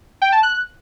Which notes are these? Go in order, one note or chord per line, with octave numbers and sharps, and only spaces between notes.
G5
A5
F#6